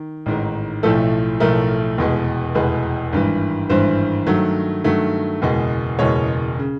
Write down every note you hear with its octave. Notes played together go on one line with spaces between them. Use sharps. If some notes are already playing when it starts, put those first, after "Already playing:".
Already playing: D#3
A1 G#2 D#3
B1 A2 F3 A3 A4
B1 A2 F3 A3 A#4
F1 E2 B2 G#3
F1 E2 B2 G#3 B4
G#1 G2 E3
G#1 G2 E3 C5
G2 D#3 F#3 A3
G2 D#3 F#3 A3
F#1 E2 B2 G#3
F#1 E2 B2 G#3 C#5
C#3